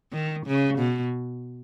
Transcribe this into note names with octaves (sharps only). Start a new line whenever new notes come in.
D#3
C#3
B2